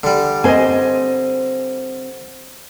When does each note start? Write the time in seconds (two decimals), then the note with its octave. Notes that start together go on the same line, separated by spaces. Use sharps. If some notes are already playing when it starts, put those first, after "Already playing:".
0.03 D3 G3
0.44 C4 C5 D#5 G#5